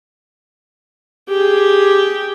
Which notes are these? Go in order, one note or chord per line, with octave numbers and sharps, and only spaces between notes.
G4 G#4